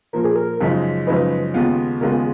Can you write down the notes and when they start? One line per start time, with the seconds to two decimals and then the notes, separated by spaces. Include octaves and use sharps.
0.13 A#2 F3 A#3 A#4
0.24 G#4
0.35 A#4
0.61 F#2 C#3 F3 G#3 D#4
1.07 F#2 C#3 F3 G#3 D#4 B4
1.54 D#2 C#3 G#3 B3 F4
2.01 D#2 C#3 G#3 B3 F4 A#4
2.12 G#4